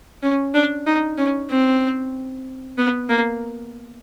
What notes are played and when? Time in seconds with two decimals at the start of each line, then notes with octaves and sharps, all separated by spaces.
0.23 C#4
0.54 D4
0.87 D#4
1.18 C#4
1.50 C4
2.78 B3
3.09 A#3